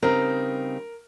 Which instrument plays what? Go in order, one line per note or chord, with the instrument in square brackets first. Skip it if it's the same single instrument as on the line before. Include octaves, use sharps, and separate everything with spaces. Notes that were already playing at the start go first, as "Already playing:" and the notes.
[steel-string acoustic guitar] C#3 G3 C4 D#4 [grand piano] A#4